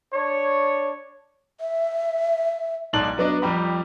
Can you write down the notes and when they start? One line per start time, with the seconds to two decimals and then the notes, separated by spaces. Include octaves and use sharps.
0.14 D4 C#5
1.61 E5
2.93 B1 G#2 D5 A5 F#6 F#7
3.18 F#3 B3 D4 D#5
3.42 F2 G3 G4 A#5 B5